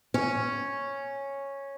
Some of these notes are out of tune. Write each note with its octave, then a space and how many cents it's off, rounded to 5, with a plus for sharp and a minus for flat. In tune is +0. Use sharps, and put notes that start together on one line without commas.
C#4 -5